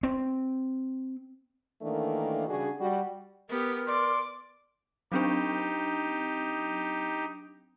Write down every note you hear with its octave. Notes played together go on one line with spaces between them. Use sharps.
C4
D#3 E3 A3 A#3 D4
C#3 G3 D4 F#4 G#4
G3 F#4
B3 G4 A#4
D5 C6 D6
F#3 C4 D4 D#4 G4